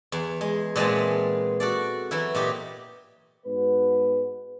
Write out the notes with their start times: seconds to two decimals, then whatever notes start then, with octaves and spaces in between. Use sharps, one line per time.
0.12 E2
0.41 G#3
0.76 A#2 E3 G#3 B3 C4 A5
1.60 F#4 A4 D5
2.11 E3 F#3 E4
2.35 A#2 D#4 G4
3.46 G#2 G#3 B3 F#4 B4